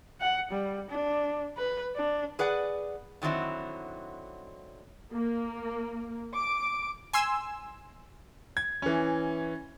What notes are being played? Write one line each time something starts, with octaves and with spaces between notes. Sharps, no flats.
F#5
G3
D4
B4
D4
G#4 B4 D5 F#5
D3 D#3 F#3 C4 E4
A#3
D6
G#5 C6 E6
G#6
E3 C#4